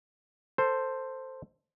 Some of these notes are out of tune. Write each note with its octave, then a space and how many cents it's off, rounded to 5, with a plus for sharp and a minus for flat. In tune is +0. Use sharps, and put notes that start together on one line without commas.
A4 +20 C5 +0